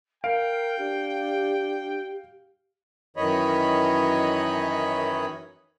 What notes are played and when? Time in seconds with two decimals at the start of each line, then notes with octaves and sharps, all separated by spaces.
0.24 A#4 F5 G5 D7
0.78 D4 G4
3.17 F#2 D#3 E3 C#5 D#5 B5